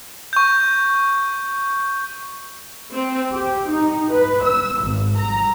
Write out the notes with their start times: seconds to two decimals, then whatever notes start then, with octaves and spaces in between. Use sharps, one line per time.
0.33 C#6 G6
2.93 C4
3.33 G4
3.71 D#4
4.12 B4
4.44 E6
4.82 G#1
5.18 A#5